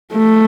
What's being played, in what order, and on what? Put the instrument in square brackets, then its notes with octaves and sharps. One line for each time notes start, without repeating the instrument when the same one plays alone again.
[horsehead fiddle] A3